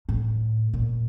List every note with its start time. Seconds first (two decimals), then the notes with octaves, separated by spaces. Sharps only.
0.09 A2
0.73 A#2